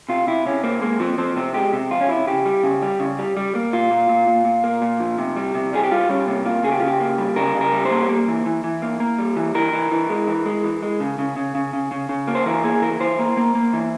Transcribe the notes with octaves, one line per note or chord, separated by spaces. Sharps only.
C3 F4
C3 E4
C3 C#4
A#3 C4
G#3 A#3
F3 C4
F3 C4
C3 C4
G#3 G4
C3
F3 F4
C#4
C3 E4
C#3 G4
G3
C#3
G3
C#3
G3
G3
A#3
A#2 F4
A#2
A#2
A#2
A#2
A#3
A#2
F3
C3
G3
C3
G3 G#4
G4
G3 F4
G3 C#4
C3 A#3
A#3 F4
C#3 G#4
G4
C#3 F4
G4
A#3
G3
C#3 A#4
C#3
A#4
G3
C5
A#3
A#3
E3
E3
E3
A#3
A#3
G3
E3
E3 A#4
E3
E3
G#3
E3
G#3
E3
G#3
C#3
C#3
C#3
C#3
C#3
C#3
C#3
A#3
C5
E3 A#4
A#3 G#4
E3 A#4
E3 C5
A#3
A#3
A#3
E3